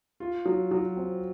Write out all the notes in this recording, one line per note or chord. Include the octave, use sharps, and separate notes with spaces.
F4
F#3
F#3
C4